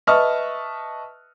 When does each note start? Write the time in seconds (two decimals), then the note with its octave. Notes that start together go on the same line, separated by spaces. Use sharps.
0.07 B4 D#5 E5 A5 C#6 F6